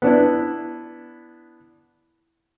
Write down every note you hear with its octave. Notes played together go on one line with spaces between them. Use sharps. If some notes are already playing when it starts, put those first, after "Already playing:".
B3 D4 E4